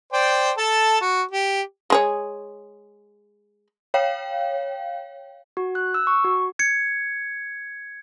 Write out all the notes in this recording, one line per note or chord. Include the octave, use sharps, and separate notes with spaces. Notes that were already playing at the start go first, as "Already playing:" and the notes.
C5 D5 G5
A4 A5
F#4
G4
G#3 G#4 C#5
C#5 F5 G5
F#4
F#6
E6
C#6
F#4
G#6 C#7